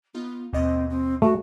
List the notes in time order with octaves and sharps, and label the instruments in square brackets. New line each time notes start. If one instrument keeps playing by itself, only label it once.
[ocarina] B3 [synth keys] D#4 F4
[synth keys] D#2 B2 D#5 [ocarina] C4
[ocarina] C4
[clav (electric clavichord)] A3 [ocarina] F#4